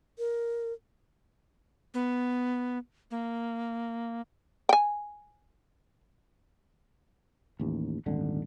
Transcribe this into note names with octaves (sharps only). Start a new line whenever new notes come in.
A#4
B3
A#3
G5 G#5
A1 D#2
D#1 G#1 D3